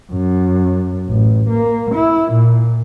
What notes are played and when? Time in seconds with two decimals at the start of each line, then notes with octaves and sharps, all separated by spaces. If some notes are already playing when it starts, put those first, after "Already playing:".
0.12 F#2
1.08 A1
1.49 A#3
1.95 E4
2.32 A#2